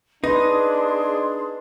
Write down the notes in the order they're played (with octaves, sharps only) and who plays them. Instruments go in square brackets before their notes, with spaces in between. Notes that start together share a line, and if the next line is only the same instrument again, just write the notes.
[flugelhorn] D4 [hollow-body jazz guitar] D#4 [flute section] G#4 C6 [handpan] B4